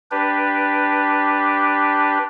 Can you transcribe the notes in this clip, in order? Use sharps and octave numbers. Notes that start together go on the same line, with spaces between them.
D4 G4 B4